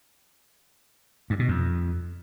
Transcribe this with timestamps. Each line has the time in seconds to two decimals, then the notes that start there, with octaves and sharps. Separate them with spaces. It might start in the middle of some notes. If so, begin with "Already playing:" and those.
1.30 G2
1.39 B2
1.49 F2